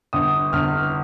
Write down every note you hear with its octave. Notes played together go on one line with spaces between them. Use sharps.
G1 D#6
G1 F6